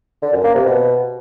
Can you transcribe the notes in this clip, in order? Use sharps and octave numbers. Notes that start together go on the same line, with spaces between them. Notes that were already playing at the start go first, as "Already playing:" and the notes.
D3
F#2
A#3
C3
B2